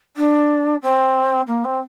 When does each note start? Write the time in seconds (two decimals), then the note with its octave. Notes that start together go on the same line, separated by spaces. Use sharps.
0.16 D4
0.82 C4
1.47 A#3
1.64 C4